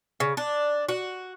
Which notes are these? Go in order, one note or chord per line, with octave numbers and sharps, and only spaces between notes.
C#3
D4
F#4